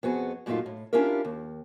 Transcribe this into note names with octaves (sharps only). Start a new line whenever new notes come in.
F2 B3 F#4 G#4
F#2 A#2 A3 D4 D#4 F4
A2
C#4 D4 E4 F4 G4 A#4
D#2